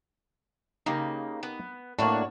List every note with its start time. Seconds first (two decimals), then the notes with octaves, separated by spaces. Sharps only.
0.86 C#3 A#3 D#4 G4 A#4
1.43 B3
1.99 A2 A#3 D4 F#4 C#5